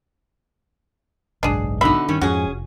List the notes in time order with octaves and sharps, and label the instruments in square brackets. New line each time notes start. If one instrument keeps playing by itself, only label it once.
[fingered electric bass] F#1 B1 G#2 [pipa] D4 G#4
[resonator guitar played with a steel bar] B2 D3 D#4 [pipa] E5 B5
[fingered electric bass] G2 [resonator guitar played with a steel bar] D#3 C#4
[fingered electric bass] F2 G#2 F3 [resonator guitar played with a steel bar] C#4 G#4 [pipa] F#4
[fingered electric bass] F1